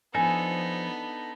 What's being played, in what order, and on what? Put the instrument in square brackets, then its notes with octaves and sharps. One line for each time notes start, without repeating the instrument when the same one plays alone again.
[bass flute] F3 [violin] B3 [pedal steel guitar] D4 D#4 A4 [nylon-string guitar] G#5